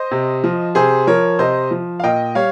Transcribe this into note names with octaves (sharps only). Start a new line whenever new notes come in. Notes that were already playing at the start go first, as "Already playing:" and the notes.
Already playing: C5 D#5
C3
F3
C3 G#4 C5
F3 A#4 C#5
C3 C5 D#5
F3
F5
A#2 D#5 G5
G3 C#5 F5